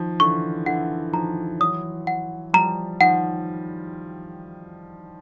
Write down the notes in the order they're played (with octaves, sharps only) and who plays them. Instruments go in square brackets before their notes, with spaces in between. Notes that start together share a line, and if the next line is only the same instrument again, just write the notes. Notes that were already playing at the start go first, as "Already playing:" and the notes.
Already playing: [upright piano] D#3 F3
[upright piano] D3 E3 [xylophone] C#6
[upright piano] D3 E3 [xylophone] F#5
[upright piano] D#3 F3 [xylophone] A#5
[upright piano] E3 F#3 [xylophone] D#6
[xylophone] F#5
[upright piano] F3 G3 [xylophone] A#5
[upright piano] D#3 F3 [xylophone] F#5